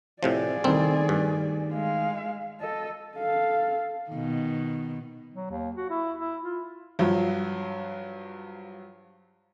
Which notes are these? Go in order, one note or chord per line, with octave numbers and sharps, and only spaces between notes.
A2 C3 F3 G#4 D5
C2 D#3 A3 C4
G2
G#3 F5
A4 D#5
A4 F5
B2 D#3
F#3
D#2
F#4
E4
E4
F4
G2 F3 F#3